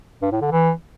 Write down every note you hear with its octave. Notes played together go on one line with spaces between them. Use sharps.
G2
A2
D3
E3